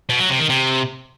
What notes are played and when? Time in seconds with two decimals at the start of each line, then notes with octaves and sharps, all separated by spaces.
0.09 B2
0.19 F#3
0.29 C3
0.39 D#3
0.49 C3